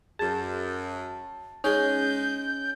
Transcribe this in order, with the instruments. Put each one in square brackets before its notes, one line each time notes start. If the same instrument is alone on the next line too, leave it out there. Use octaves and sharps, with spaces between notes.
[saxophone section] F#2 [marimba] G#4 [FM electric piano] A5
[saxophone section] G#3 [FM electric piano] C#4 [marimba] D#4 G#4 [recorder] G6